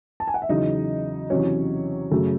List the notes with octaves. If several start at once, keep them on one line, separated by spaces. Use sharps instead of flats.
A5
G#5
F#5
E5
E2 C#3 F#3 D#4 D#5
E2 C3 F#3 C#4 C#5
F#2 C#3 F#3 A3